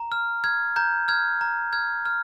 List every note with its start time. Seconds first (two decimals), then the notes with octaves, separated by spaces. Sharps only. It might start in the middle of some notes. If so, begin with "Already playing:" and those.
Already playing: A#5
0.12 F6
0.44 F6 G#6
0.76 A#5 G6
1.08 F6 G#6
1.41 A#5
1.73 F6 G#6
2.06 F6